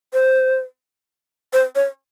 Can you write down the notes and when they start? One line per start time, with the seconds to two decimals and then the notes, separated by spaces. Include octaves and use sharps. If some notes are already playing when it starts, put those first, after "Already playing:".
0.13 C5
1.53 C5
1.75 C#5